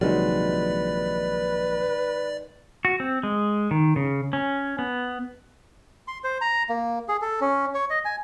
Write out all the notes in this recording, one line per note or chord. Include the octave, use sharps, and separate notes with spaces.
A#1 C3 D#3 F#3 G#3 B4 D5
F#4
C4
G#3
D#3
C#3
C#4
B3
C6
C5
A#5
A#3
G#4
A4
C#4
C#5
D#5
G#5